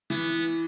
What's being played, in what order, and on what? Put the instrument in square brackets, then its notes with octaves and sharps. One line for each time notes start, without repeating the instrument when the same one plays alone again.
[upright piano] E3 [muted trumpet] B3